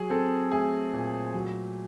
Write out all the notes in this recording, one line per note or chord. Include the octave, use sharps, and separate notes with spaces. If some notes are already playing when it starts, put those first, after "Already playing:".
Already playing: F#3 G#4
C4 A4
A3 G#4
A#2
F#3